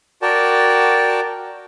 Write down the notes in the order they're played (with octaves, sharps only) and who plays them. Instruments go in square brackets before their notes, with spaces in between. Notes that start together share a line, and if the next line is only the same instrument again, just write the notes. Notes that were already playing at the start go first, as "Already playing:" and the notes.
[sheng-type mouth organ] F#4 A#4 D5 G5 A5